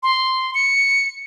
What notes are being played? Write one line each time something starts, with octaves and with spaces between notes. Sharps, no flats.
C6
C#7